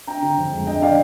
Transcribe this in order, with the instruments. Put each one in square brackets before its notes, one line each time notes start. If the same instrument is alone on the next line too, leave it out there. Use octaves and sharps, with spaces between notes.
[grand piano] D4 G5 A#5
D3
F2
G#3
D4 D#5 G5
D3 D5 F5